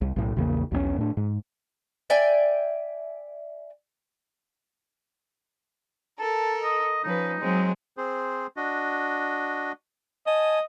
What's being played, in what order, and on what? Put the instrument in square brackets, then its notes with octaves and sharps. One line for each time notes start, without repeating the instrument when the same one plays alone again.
[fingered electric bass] C2
B1 A2
A#1 E2 C#3 A#3
B1 E2 F3 C#4
A2 D4
G#2
[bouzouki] D5 E5 G5 G#5
[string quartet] A4 A#4 [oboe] A5
[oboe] D#5
[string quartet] F3 C#4 B4 [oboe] D#4
[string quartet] F#3 G#3 C4
[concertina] C4 G#4 C5
D4 F#4 D#5
[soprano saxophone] D#5 [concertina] G#5 A5